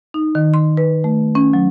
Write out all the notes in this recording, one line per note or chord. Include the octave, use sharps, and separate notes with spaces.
D#4
D#3
C6
B4
A3
C#4
F#3